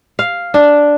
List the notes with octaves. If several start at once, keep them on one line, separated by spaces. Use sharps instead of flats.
F5
D4